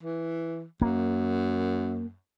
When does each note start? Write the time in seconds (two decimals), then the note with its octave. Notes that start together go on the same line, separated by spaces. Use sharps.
0.03 E3
0.82 F#2 A#3